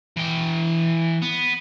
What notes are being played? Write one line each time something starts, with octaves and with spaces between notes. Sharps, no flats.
E3 G5
B3